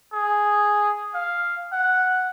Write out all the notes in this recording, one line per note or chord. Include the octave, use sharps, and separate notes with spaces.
G#4
F5
F#5